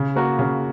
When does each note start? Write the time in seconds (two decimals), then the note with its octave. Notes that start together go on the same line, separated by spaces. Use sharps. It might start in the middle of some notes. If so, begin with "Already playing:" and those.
Already playing: C#3
0.16 A#3 F#4 A#4
0.39 C#3